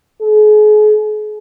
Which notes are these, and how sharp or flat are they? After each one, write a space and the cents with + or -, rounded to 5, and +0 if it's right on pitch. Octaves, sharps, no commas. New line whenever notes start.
G#4 +40